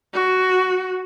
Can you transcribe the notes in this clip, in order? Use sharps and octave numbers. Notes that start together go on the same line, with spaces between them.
F#4